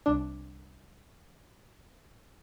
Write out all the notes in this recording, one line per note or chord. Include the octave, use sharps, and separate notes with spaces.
C2 D4